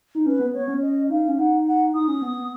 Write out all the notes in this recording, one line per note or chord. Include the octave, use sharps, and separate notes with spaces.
D#4
C#4 B4
B3
B3 C#5
C#4
D#5
D#4 F5
C#4
D#4 F#5
F#5
D#4 D#6
C#4
B3
B3